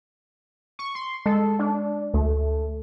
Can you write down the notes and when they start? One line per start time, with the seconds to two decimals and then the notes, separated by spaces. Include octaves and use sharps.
0.79 C#6
0.95 C6
1.26 G#3 A4
1.59 D4
2.14 D2 A3